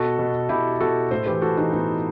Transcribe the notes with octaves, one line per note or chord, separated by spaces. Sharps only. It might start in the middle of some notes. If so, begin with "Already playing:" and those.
Already playing: B2 F#4 A4
B2
B2 E4 G4
B2 F#4 A4
A2 A4 C5
E3 G4 B4
A2 F#4 A4
E3 D#4 F#4
A2 B3 D#4
E3